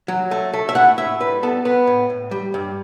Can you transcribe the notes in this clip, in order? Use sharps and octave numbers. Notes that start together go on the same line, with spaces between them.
F#3
A3
A3
E5
A2 F#5
A2 E5
G3 B4
B3 A4
B3 B4
A2
A2
G3
G2